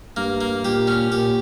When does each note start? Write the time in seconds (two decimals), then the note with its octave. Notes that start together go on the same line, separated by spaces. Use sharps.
0.17 G2 A#3
0.41 A#3
0.64 A#2 G4
0.87 C#4
1.11 A#2 G4